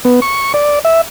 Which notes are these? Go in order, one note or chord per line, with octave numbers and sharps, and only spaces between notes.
B3
C#6
D5
E5